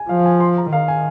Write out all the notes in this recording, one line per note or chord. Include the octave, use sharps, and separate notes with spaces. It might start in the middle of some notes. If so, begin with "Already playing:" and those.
Already playing: G#5
F3 F5
G#5
C6
A#5
D#3 F5
G#5